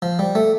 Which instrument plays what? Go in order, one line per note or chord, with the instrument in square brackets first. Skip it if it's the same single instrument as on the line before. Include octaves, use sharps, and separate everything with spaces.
[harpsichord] F3
G3
A3